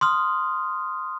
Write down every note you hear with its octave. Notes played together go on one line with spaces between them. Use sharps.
C6 D#6 F6